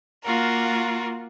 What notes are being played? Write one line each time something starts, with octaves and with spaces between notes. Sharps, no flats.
A#3 F4 F#4 A#4